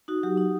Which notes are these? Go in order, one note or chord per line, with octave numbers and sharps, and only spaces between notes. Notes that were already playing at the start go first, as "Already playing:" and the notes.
D#4 F#4
F#3 G4
D#4